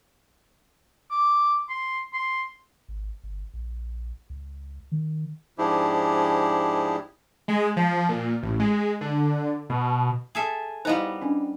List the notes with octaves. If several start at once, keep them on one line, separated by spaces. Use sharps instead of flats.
D6
C6
C6
G#1
G1
A#1
C#2
D#3
G#2 F3 D4 E4 G4 G#4
G#3
F3
A#2
A1
G#3
D3
B2
G#4 A4 E5
G3 B3 D#4 E4 C5 D#5 F5 A#5
C#4 D4